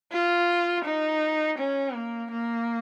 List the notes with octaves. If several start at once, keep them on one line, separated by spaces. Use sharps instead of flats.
F4
D#4
C#4
A#3
A#3